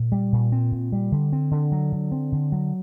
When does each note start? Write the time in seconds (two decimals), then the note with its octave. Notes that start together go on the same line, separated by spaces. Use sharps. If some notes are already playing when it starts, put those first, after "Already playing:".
Already playing: A#2
0.12 G3
0.32 A#2
0.52 C4
0.72 A#2
0.92 G3
1.12 D3
1.32 C4
1.51 D3
1.72 F#3
1.92 D3
2.12 C4
2.32 D3
2.52 F#3